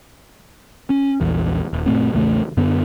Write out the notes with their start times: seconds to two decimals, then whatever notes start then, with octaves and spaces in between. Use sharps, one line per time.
0.90 C#4
1.21 A#1 E2
1.73 D#1
1.86 F#1 A#2 A3 C4
2.13 A#1 E2 C#3 A3
2.57 F#2 D3 B3